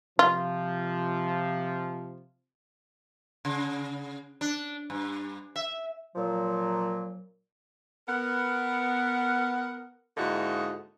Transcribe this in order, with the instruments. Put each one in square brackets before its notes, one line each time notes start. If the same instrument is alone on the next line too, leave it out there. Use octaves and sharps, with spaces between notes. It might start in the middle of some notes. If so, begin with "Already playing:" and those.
[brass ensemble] C3 F3 [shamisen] F4
[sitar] C#3
D4
G2
E5
[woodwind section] A#2 F3 F#3
[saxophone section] B3 A#4 F#5
G#2 D3 A#3 D#4 E4 F#4